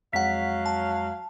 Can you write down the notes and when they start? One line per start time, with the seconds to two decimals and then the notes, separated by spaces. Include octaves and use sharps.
0.13 F2 F#3 G#3 F5 F#5 B6
0.66 A5